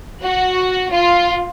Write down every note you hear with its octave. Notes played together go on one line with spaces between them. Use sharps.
F#4
F4